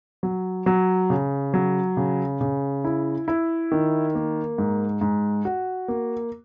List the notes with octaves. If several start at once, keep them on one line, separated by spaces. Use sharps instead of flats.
F#3
F#3
C#3
F#3
C#3
C#3
E4
E4
D#3
A#3
G#2
G#2
F#4
A#3